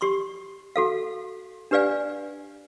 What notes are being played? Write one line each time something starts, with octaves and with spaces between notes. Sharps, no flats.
G4 C6 C#6
F#4 A4 F5
D4 G4 B4 D5 F5 G#5